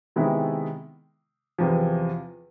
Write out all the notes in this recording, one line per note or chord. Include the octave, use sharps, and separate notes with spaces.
C3 D#3 G#3 B3 E4
E2 C3 F3